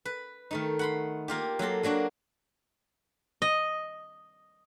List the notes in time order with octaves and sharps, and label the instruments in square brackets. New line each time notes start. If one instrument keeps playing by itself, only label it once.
[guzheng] B4
D#3 A3 D#4
F#5 B5 C6
A#3 F4 G4
F#3 A#3 A4 C6
F#3 A#3 D4 F#4
D#5